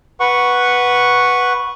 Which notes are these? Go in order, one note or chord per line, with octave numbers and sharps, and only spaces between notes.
B4 F#5 C#6